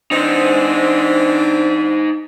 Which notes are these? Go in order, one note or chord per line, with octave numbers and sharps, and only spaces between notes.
E3 C4 D4 D#4 C5